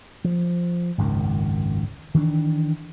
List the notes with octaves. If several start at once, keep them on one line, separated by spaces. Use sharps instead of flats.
F3
G#1 C#2 F#2 D#3
D#3 E3 C#4 D4